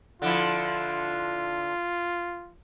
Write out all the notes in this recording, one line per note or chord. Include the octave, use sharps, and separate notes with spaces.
D3 F3 E4 F4